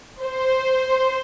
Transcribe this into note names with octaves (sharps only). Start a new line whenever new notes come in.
C5